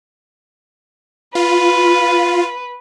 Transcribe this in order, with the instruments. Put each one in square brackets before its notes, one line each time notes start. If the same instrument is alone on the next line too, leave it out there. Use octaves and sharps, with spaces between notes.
[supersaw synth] F4 [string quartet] B4